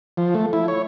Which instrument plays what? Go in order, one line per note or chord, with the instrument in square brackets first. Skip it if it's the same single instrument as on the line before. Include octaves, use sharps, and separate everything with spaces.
[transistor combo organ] F3
A3
E4
C#5